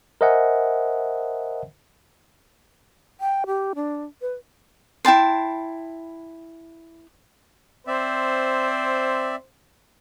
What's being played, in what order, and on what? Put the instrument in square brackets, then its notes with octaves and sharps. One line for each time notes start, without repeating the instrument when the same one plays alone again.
[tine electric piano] A#4 C5 D#5 E5 F#5 G#5
[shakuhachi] G5
G4
D4
B4
[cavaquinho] E4 G5 A5 C6
[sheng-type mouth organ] C4 D5 E5 [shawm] C5